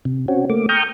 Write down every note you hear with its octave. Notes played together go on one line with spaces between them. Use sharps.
C3
C4 C#4 F#4
A3 A#3 D6
G5 A#5 C#6 D#6 F6 G6